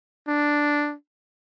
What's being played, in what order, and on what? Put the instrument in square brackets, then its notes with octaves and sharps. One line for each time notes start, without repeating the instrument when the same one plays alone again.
[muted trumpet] D4